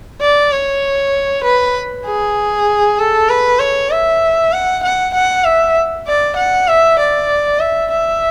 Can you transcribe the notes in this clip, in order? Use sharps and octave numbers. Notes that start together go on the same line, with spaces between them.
D5
C#5
B4
G#4
A4
B4
C#5
E5
F#5
F#5
F#5
E5
D5
F#5
E5
D5
E5
E5